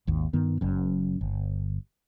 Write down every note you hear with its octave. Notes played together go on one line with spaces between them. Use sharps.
G#1 D#2
G2 D#3 B3
F#1 F#2
G1